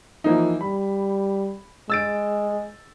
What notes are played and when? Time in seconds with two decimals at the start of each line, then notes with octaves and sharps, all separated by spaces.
0.24 E3 F3 A#3 D#4
0.61 G3 B5
1.90 G#3 E6 A6 D7